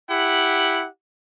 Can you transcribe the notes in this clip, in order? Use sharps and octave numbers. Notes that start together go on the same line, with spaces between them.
E4 G4 F#5